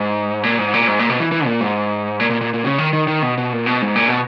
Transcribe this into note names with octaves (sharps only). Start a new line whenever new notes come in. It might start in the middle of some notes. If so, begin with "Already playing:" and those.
Already playing: G#2
A#2
G#2
A#2
G#2
A#2
B2
E3
E3
A#2
G#2
A#2
A#2
A#2
A#2
C#3
D#3
D#3
D#3
B2
B2
A#2
B2
G#2
A#2
B2